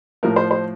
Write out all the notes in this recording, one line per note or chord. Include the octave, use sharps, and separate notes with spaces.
A2 F3 A#4
C5
C5